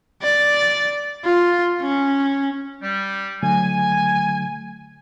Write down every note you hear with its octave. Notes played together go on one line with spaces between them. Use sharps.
D5
F4
C#4
G3
D3 F#3 A3 G#5